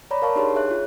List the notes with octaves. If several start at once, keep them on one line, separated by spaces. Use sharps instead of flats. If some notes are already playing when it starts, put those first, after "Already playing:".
C#5 D5 A#5 B5
A#4 F5 A5 C#6
D4 D#4 G4 G#4 C#5 C6
G#4 C#5 E5 F#6
F4